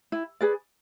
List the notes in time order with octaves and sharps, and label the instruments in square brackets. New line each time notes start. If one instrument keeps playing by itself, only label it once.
[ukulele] E4
G#4 B4 D5